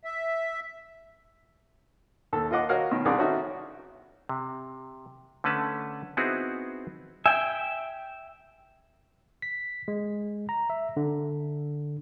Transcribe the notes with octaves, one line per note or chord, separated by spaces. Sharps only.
E5
D#2 A4
F4 A#4 D#5 F#5 D6
F#4 A#4 C#5 D#5 F5 F#5
B2 D#3
C2 C3 D4 G#4 D6
C#4 D#4 F#4 A4 E5
C3
D3 A3 C#4 B4 A5
B3 C4 D#4 E4 F#4 G#4
E5 G5 G#5
B6
G#3
A#5
E5
D3